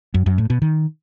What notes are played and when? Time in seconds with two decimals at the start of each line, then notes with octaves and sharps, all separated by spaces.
0.14 F#2
0.26 F#2
0.38 A2
0.50 B2
0.62 D#3